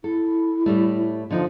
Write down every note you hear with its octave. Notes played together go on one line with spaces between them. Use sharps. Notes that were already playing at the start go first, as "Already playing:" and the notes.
E4 A4
A2 G3 A3
D3 F3 D#4